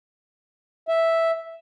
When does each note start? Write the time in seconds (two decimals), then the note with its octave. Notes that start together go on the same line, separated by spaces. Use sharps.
0.88 E5